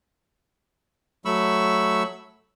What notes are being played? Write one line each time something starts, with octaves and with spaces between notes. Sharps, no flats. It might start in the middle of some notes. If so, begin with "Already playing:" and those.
F#3 A3 B5 C#6 E6